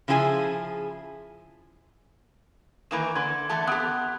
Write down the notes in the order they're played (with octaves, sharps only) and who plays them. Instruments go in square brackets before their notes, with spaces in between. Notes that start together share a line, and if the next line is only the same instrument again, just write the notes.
[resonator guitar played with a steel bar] C#3 F3 E4 G#4 G#5
[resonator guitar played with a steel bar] D#3 E3 A#3 [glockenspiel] B5 E7
[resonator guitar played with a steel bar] D3 [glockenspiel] C6 G#6
[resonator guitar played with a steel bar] E3 A3 A5
[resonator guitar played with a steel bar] B3 G4 [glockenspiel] F#6